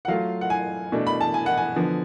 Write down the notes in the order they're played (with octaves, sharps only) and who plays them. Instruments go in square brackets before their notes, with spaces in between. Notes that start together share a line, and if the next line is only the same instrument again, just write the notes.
[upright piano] F#5
F#3 A3 F4 F5
F#5
G#5
B2 A3 D4
B5
A5
G#5
F#5
G#5
D3 F3 B3